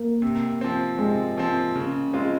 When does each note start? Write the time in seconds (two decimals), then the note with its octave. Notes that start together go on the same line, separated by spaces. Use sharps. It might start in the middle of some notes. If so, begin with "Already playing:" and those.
Already playing: A#3
0.22 C3
0.61 F3 C4
0.98 C3 G#3
1.37 F3 C4
1.76 C#3
2.13 G#3 C4 F4